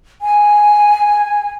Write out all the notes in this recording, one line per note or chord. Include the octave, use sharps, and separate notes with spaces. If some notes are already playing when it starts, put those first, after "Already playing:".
G#5